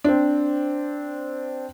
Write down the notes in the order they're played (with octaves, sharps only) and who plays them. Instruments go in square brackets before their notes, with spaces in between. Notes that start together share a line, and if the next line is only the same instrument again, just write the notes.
[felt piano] C4 D4